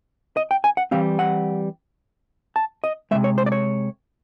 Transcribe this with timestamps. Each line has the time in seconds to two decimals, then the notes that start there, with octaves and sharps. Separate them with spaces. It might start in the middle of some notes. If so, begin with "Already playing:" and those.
0.37 D#5
0.51 G5
0.64 G#5
0.77 F#5
0.91 E3 G3 C4 F5
1.19 F#5
2.56 A5
2.84 D#5
3.11 C3 D#3 G#3 E5
3.24 C#5
3.38 C5
3.46 D5
3.52 C#5